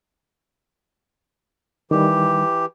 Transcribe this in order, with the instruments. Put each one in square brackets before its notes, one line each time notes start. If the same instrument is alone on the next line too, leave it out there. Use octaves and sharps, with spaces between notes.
[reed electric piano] D#3 G3 [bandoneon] E3 G4